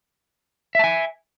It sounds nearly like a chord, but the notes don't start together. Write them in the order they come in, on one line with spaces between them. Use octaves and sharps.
E5 A5 G#5